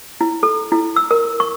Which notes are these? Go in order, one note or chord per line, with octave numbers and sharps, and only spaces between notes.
E4
A4
E4
E6
A#4
C#6